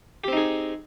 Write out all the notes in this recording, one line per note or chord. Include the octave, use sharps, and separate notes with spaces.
C4 D#4 G4 G#4